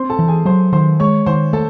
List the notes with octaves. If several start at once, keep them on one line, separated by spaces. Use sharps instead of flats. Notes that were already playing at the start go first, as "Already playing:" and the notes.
Already playing: C4 C5 C6
A4 A5
E3
G#4 G#5
F#3 C5 C6
D#3 C5 C6
G#3 C#5 C#6
D#3 C5 C6
A3 A4 A5